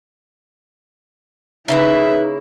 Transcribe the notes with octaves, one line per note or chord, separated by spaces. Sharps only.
C#3 A#3 D#4 E4 B4 E5